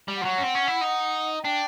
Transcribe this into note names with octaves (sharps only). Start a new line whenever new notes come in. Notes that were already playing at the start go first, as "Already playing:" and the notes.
G3
F3 F#5
F#3
C#4
C4
C#4
E4
D#4
D4 G5